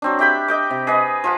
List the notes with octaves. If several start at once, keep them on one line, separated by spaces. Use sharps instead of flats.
F#3 C4 D4
G4 E5 G5 B5
D#5 G5 D6
C3
G#4 B4 D#5
F3 F4 F#5